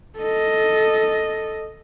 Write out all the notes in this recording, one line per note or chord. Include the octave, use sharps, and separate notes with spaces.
A4 D#5